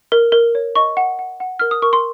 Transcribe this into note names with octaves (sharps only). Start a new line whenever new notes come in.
A#4
A#4
C#5
D#5 C#6
F#5
F#5
F#5
A#4 F6
D#6
A#4 C#6
C6